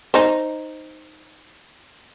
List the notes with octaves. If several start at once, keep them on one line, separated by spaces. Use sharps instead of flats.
D#4 C5